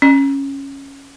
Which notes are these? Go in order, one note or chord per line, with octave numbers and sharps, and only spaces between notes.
C#4